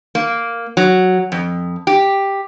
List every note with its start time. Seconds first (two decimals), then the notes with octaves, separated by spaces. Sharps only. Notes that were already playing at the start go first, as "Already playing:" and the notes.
0.15 A#3
0.77 F#3
1.32 F2
1.87 G4